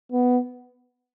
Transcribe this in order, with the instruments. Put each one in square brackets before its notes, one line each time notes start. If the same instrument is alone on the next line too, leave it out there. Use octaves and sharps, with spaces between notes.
[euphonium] B3